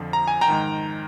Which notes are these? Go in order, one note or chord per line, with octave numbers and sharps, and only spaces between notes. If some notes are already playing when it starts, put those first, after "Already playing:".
Already playing: F2 D3 F3
A#5
G#5
G5 A#5
G#2 D#3